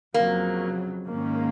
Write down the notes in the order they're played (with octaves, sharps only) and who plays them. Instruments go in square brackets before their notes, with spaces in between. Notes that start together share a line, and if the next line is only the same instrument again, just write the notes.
[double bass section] F2 C#3 F#3 [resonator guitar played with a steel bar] A#3
[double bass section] G#2 D#3 A#3 C#4